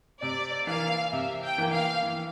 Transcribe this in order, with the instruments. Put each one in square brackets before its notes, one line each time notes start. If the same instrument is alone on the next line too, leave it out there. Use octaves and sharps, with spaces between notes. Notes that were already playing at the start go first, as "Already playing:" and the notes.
[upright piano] C3 [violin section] D5
[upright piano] E3 A#3 [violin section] F5
[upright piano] C3 [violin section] E5
[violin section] G5
[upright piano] E3 A#3
[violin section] F5
[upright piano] E3